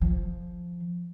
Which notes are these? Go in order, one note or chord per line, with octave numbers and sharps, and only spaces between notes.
F3